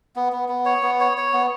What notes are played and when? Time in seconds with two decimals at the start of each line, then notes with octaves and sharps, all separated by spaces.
0.16 B3
0.32 B3
0.49 B3
0.66 C#5
0.83 B3
1.01 C#5
1.17 C#5
1.34 B3